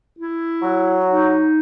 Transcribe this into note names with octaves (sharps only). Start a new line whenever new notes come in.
E4
F#3
D#4